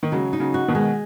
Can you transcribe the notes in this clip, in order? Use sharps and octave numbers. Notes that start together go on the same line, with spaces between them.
D#3
C#3 F#3 G#3
D#4
C#3 F#3
F#4
B2 D#3
G#3